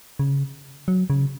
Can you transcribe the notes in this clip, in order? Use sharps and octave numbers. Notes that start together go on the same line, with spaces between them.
C#3
F#3
C#3